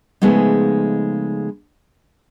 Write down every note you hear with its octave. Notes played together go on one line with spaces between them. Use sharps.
C#3 F3 G#3 A3 B3 D#4